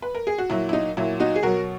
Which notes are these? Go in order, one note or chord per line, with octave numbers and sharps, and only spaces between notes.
B4
A#4
G#4
F#4
A#2 F#3 E4
E4
D#4
A#2 F#3 E4
D#4 F#4
G#4
B2 F#3 F#4 A#4